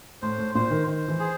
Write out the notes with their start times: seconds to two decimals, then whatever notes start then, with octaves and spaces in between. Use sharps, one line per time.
0.22 A2 C5
0.38 A2
0.55 A#2 C5
0.71 D#3
0.87 D#3 C5
1.08 E3
1.20 G#4